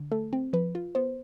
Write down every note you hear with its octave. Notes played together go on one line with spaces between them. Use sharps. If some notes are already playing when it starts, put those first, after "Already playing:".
Already playing: D3
A3 A4
C4
F3 B4
F4
B3 C5